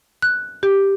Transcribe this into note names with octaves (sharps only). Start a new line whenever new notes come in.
F#6
G4